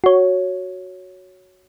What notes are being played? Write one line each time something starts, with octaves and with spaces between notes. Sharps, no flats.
F#4 C#5